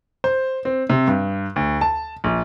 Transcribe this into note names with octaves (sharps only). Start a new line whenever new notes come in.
C5
C4
C3
G2
D2
A5
A#1